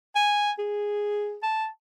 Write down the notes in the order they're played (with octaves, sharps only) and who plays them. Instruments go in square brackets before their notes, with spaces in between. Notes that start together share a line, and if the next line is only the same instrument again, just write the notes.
[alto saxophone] G#5
G#4
A5